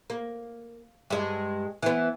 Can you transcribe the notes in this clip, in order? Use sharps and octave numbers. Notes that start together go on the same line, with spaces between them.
A#3
G2 G#3
E3 B3